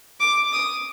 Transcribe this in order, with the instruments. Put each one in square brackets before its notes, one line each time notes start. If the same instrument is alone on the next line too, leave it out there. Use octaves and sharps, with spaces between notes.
[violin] D6
D#6